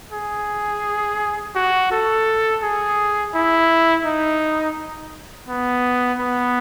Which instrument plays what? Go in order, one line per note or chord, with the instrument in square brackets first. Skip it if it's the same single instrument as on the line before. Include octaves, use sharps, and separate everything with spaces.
[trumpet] G#4
F#4
A4
G#4
E4
D#4
B3
B3